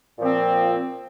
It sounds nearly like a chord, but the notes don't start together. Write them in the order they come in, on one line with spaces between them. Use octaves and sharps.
A#2 F3 C4